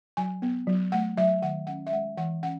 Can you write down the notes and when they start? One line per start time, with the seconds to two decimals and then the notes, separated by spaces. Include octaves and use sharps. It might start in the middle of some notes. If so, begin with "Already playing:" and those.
0.17 F#3 G#5
0.42 B3
0.67 F#3
0.92 A3 F#5
1.17 F#3 E5
1.42 D#3 F#5
1.67 C#4 F#5
1.87 E5
1.92 G#3 F#5
2.17 E3 F#5
2.43 C#4 F#5